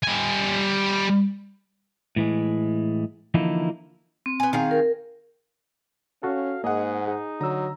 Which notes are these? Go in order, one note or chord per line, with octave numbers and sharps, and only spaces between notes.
G3 G#5
A2 E3 G#3
D3 E3 F3 A#3 D#4 E4
C4
B3 G#5
D#3 G#4 F5
A#4
C#4 F#4 A4 F5
G#2 A#3 G#4 D#5 F#5
D#4 G#4
D3 F#3 A#5 E6